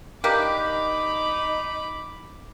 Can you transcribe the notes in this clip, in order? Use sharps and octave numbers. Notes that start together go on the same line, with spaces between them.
A#3 D4 D#4 G4 B5 D6